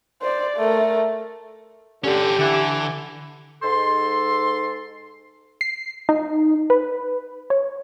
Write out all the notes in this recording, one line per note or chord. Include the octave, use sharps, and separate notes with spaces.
C5 D5
A3 A#4
D3 C#4 G4 A4
D3 E3
G#2 A4 C6
C7
D#4
B4
C#5